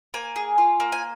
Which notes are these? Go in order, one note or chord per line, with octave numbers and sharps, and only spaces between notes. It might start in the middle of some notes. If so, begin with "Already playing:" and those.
A#3 G#5
G#4
F4
A#3
G#5